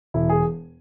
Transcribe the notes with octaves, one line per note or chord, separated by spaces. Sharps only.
E1 E4
G#4